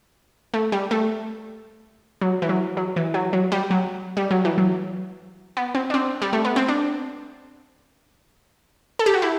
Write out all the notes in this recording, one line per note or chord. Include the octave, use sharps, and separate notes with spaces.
A3
G3
A3
F#3
E3
F#3
F#3
E3
F#3
F#3
G3
F#3
G3
F#3
E3
F#3
B3
C4
D4
C4
G3
A3
B3
C4
D4
A4
G4
F#4
E4